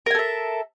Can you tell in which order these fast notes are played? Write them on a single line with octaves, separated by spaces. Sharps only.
A#4 G#5 A4 E5